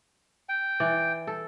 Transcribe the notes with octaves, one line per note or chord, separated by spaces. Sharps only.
G5
E3 D5
A4